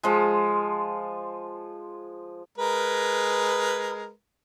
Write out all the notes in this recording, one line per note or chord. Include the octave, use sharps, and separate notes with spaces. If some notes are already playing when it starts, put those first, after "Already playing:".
F3 G#3
G#3 A#4 B4